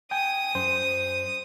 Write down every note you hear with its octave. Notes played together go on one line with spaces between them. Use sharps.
G5 G#5 D#6
F#2 C5